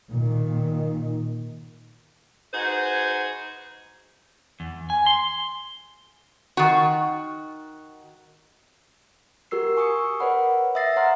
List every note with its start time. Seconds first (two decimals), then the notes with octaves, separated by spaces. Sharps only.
0.11 A#2 D#3
2.54 D#4 F#4 G#4 B4 C5
4.60 E2
4.90 G#5
5.06 C6
6.57 D#3 F#4
9.51 F#4 G4 A#4 E6 C7
9.77 G#5 C#6 D#6 E6 C#7
10.20 A#4 B4 C#5 D5 F#5 B5
10.75 E5 D#6 E6 A6 A#6 C7
10.96 C#5 F#5 A#5 C6 F6